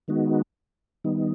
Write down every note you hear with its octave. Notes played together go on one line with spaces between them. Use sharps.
D#3 G#3 B3 D#4 F#4
D#3 G3 B3 D#4